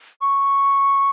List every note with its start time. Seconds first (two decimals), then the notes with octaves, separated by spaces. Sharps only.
0.21 C#6